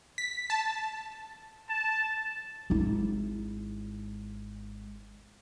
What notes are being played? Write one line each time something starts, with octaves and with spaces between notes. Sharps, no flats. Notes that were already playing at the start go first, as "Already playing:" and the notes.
B6
A5
A5
G#1 E4